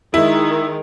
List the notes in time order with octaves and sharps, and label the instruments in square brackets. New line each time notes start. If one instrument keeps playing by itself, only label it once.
[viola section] D#3 G#3 [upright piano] E4